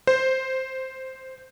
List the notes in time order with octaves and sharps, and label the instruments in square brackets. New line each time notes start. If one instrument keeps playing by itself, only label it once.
[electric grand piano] C5